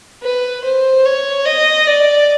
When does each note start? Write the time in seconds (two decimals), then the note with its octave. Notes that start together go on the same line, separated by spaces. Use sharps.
0.23 B4
0.64 C5
1.06 C#5
1.46 D#5
1.87 D5